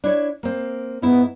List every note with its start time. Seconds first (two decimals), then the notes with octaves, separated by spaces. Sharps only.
0.04 D4 E4 C#5
0.43 A#3 C4
1.02 G#2 B3 E4